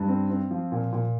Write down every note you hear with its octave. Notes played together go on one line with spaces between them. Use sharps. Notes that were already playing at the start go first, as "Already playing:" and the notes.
Already playing: G2
C4
C4
F3
A#2
A#2